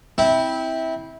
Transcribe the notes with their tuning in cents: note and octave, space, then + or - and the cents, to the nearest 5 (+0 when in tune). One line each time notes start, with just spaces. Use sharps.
C4 +0 E4 -20